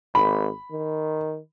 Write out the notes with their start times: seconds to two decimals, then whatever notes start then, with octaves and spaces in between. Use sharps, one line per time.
0.15 G#1 B5
0.71 D#3